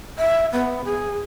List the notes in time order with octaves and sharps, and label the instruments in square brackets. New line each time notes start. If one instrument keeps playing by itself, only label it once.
[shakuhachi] E5
B3
G#4